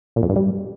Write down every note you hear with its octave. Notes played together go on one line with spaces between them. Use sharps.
A#2
F2
G2
G3